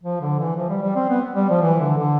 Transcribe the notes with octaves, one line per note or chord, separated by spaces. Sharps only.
F3
D3
E3
F3
G3
G3
C4
B3
G3
F3
E3
D3
D3